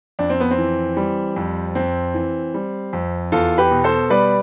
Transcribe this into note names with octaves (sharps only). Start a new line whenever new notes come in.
F2 D4
C4
B3
C4
E3
G3
F2
F2 C4
E3
G3
F2
E2 F4 A4
G4 B4
B2
A4 C5
G3 B4 D5